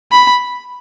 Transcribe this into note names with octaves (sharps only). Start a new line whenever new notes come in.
B5